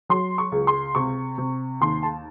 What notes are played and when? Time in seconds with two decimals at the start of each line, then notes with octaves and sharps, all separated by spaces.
0.09 F#3 C6
0.38 C#6
0.52 C#2
0.67 C6
0.95 C3 C#6
1.38 C3
1.81 D#2 C6
2.03 A5